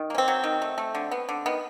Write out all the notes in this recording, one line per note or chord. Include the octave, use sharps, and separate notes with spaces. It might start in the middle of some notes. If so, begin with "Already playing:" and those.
Already playing: D#3
A#3 C#4
C4
F#3
D#3
A3
A3
D3
B3
D3
D#3 B3